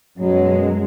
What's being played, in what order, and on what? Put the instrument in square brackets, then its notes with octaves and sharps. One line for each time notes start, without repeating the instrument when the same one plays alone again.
[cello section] F#2 G#3 [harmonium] B2 F#3